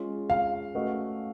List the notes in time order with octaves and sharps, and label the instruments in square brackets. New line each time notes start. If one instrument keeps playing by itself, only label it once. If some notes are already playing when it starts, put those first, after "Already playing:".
Already playing: [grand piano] G#3 C#4 F4
[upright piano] F5
[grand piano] A3 C#4 F#4 B4 D#5